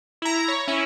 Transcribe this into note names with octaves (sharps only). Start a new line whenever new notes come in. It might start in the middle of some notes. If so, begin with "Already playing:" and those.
E4 A#5
C#5
C#4 E4